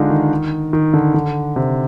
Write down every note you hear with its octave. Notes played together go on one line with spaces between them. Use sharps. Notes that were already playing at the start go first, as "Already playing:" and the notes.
Already playing: D3 G#3 D4 D#4 F4
D#3
D#3
D3
D3
C3